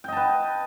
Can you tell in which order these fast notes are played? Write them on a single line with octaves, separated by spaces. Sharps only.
G5 D#5 A5 B4